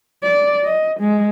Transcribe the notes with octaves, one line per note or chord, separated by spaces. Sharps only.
D5
D#5
G#3